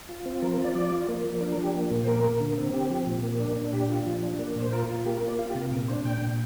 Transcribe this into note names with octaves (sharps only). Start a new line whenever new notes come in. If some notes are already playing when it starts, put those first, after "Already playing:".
F4
C4
F3 A#4
A#4
F4
D5
F3 D5
F4
A#3
F3
D4 A#4
A#4
F3
G4
A#3
A#2
C5
A#3 A#4
A#3
D3
C4
C4 G4
F3
A#2
A#3
D4
D4
A#2 G4
F4
F3
D4
A#3
A#2 C5
F4 A#4
F4
A#3 G4
A#4
A#3
D5
F4 F5
G4
C3
A#4
A#2 A#4
D4 C5
A#2 G5
A#2